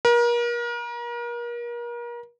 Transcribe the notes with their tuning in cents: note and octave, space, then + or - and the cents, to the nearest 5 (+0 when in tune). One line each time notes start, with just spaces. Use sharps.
A#4 +35